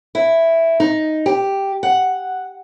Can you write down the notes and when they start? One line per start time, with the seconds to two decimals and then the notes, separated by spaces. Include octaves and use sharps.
0.15 E4
0.80 D#4
1.26 G4
1.83 F#5